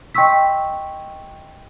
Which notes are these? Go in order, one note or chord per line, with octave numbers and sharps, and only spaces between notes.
D#5 G5 C6 C#6 E6 B6